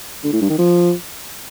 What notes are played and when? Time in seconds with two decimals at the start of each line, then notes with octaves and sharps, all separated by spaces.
0.24 D3
0.32 A2
0.41 G2
0.50 D#3
0.58 F3